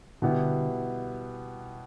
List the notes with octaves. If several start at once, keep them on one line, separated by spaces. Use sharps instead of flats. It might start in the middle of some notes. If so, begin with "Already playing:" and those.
B2 D3 G3 B3 E4 G4